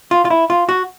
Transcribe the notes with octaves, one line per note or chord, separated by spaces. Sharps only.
F4
F4
E4
F4
F#4